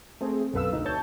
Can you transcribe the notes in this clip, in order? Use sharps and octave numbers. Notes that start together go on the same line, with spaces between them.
A3 C4 G#4
B1 F#2 A4 B4 F5 E6
D2 D#4
C#5 A5 G6